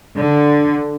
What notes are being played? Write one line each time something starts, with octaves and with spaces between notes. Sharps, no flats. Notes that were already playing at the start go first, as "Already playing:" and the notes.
D3